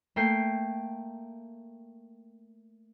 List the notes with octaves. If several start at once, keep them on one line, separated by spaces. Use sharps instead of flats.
A3 A#3 G5 C7